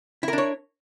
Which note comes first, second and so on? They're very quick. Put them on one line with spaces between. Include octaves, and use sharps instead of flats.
E4 A#4 D4 C#5